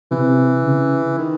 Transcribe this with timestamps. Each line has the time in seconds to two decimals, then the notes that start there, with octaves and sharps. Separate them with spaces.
0.11 C3 E3
0.64 C#3
1.18 D#3